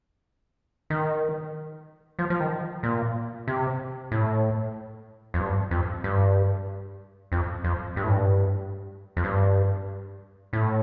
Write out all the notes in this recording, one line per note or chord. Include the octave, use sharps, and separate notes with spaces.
D#3
F3
F3
D#3
A#2
C3
A2
F2
G2
F2
G2
F2
F2
G2
A2
G2
F2
G2
A2